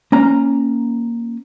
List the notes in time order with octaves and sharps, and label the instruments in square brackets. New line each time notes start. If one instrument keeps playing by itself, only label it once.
[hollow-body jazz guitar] A#3 C#4 A#5